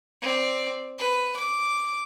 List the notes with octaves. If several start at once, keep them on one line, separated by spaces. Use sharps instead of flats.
C4 D5
B4
D6